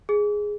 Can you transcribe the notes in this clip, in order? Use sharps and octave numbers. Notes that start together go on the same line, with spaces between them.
G#4